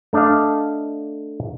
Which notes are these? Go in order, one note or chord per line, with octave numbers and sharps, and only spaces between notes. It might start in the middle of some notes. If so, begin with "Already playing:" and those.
A3 D4 D5 D#5 F5